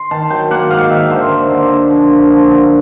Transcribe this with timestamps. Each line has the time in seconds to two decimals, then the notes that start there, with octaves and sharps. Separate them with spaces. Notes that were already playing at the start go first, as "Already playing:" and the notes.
Already playing: C6
0.11 D#3 A5
0.30 F#3 G5
0.51 A#3 F#5
0.70 G#2 F5
0.90 D#3 E5
1.10 D3 C5
1.30 A#3
1.51 D3
1.70 D3
1.90 F3
2.10 A#3
2.30 F3
2.50 D3